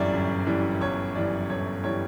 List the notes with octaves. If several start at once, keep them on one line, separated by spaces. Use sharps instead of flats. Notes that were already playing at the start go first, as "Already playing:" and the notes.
Already playing: G1 F#2 E3 G3 D5 E5
G1
F#2 E3 G3
G1 C#5
F#2 E3 G3 D5
G1 C#5
E3 G3 C#5